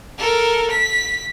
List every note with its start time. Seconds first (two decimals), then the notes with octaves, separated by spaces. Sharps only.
0.18 A4 A#4
0.70 B6